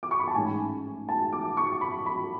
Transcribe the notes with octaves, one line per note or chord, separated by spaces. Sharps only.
D6
C#6
B5
A5
A1 G#2 G#3 C#4 G#5
A5
D6
C#6
B5
B5